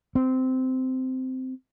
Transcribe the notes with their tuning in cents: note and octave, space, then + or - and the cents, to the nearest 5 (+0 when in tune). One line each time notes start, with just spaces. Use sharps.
C4 -15